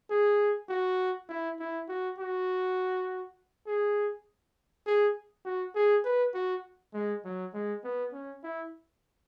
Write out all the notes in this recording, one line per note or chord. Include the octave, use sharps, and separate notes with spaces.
G#4
F#4
E4
E4
F#4
F#4
G#4
G#4
F#4
G#4
B4
F#4
G#3
F#3
G#3
B3
C#4
E4